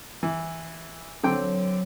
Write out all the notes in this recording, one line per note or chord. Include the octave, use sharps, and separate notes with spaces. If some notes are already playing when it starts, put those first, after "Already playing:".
E3
D3 F#3 C4 G5